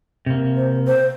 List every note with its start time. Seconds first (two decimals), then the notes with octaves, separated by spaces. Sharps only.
0.26 C3 A#3
0.56 C5
0.87 C5